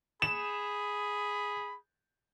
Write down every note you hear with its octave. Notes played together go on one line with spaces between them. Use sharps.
G#4 B5 E7